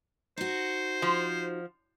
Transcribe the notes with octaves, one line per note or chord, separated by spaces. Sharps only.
D#4 F#4 C5
F3